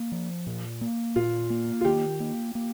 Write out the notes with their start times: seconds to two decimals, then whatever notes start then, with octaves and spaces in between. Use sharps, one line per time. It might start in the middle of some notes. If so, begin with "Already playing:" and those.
Already playing: A#3
0.12 F3
0.47 A#2
0.81 A#3
1.16 A#2 F4
1.50 A#3
1.81 F4
1.85 D#3 G4
2.20 A#3
2.55 A#3